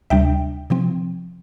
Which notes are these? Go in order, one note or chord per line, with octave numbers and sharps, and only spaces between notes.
D2 C3 G3 D4 E5 G5
C3 F3 C4